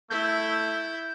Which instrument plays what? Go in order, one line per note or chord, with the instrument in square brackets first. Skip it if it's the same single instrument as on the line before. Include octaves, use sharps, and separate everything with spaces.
[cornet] A3 [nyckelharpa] E4 [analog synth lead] G6